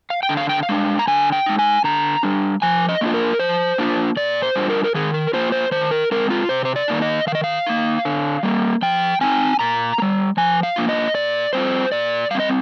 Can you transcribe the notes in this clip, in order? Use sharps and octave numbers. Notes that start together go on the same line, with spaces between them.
F5
G5
D3
F5
G5
F5
G#3 D4
A#5
D3 G#5
G5
G#3 D#4
G#5
D3 A#5
G3 D4
F3 G#5
D#5
A#3 D4 F4
A#4
F3 C5
A#3 D4 F4
A#2 D5
C5
G3 D4 F4
A#4
A#4
D#3 G#4
A#4
A#3 F4 C5
C5
D#3 C5
A#4
G#3 C4 A#4
F4
C3 C5
C5
D5
D#3 A#3 D#4
D#5
D#3 F5
D#5
F5
A#3 D#4
D3
G3 A#3
F3 G5
C4 D#4 G#5
A#2 A#5
A#3
G3
F3 G#5
F5
A#3 D4 F4
D#5
A#2 D5
G3 C4 F4 C5
A#2 D5
G3 C4 D#5 F5